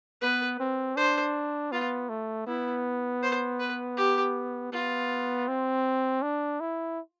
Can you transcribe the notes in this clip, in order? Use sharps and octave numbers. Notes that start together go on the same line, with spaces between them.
B3 B4
C4
D4 C5
B3 F4
A3
B3 E4
C5
B4
G4
B3 F4
C4
D4
E4